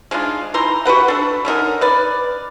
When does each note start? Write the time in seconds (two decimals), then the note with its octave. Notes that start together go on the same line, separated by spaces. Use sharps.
0.11 G#3 D4 D#4 F4
0.54 E3 D#4 A#5 C6
0.85 F#4 G4 B4 F#5
1.08 D4 A4
1.45 D3 C#4 D#4 A#4
1.81 B4 D5